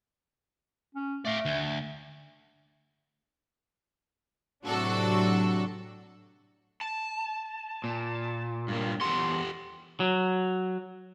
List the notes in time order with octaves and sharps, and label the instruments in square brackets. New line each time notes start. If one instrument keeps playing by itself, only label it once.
[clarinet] C#4
[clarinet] A3 [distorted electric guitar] D5 F5
[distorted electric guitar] D2
[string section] A2 C3 F#3 D4 F#4 A4
[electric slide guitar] A5
[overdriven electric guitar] A#2
[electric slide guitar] G2 A#3
[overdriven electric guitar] E2 C6 [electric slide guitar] G4 A4 F#5
[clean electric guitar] F#3